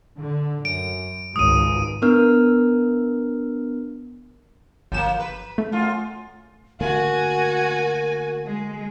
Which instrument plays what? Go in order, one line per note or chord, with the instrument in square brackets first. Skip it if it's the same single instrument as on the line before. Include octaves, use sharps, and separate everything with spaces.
[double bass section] D3
[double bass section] F#2 [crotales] D7
[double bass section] G#1 C#2 G#2 [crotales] D#6 D#7
[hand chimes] B3 D4 A#4 F6
[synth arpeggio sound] G1 E7 [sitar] F3 A#3
[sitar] B4
[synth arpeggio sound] A3
[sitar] F#2 F4
[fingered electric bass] D3 A3 A#3 [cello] F#4 [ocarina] A#4 [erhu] G#5
[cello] G#3